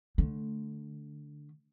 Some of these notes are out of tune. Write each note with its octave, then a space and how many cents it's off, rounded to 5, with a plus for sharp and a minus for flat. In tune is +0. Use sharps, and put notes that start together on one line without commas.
D3 +0 A3 -15